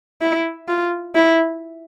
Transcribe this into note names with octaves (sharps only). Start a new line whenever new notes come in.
E4
F4
E4